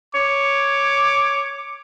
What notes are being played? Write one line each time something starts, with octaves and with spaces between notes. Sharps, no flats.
C#5 D6